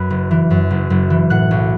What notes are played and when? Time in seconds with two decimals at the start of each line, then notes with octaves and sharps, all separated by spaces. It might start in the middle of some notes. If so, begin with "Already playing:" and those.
Already playing: F#2 B4 B5
0.10 F#1
0.31 E3
0.50 F#2
0.71 F#1
0.90 F#1
1.10 E3
1.30 A2 F#5 F#6
1.51 B1